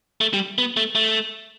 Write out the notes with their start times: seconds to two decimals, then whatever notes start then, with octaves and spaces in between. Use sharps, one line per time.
0.21 A3
0.34 G3
0.58 B3
0.77 A3
0.95 A3